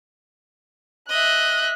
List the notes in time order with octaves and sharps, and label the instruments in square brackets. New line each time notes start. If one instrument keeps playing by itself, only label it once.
[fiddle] D#5 E5 [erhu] F#6